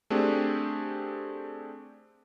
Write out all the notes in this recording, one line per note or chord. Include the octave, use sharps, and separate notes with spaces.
A3 C4 D4 G4 G#4